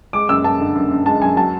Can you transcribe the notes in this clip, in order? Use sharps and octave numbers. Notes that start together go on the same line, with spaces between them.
G#3 D6
F#2 E6
F#2 A5
D3
F#2
F#2
G#3 A5
F#2 G#5
F#3 A5